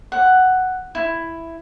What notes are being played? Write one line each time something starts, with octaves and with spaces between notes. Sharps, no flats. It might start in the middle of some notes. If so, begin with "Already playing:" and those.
F#5
E4